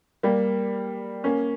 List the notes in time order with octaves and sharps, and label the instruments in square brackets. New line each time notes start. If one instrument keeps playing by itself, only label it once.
[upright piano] G3 A#3
A#3 C#4